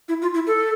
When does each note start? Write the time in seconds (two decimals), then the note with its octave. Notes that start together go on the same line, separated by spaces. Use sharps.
0.09 E4
0.22 F4
0.34 E4
0.47 A4